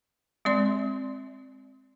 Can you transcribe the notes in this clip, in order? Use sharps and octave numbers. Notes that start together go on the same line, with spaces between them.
G#3 C4 D5 C6